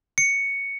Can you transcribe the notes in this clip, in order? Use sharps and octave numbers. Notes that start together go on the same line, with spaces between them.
C#7